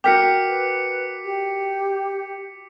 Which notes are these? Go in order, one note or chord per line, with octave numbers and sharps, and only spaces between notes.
F#4 A#4 G5 D6 B6 C#7
B4
G4